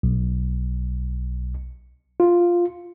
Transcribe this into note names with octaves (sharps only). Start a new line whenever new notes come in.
B1
F4